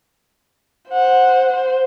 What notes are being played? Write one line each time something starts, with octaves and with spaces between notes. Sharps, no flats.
C5 F#5
C5